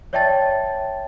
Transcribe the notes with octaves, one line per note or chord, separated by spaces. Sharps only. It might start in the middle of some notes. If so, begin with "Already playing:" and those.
C#5 D5 E5 G5 A5 A6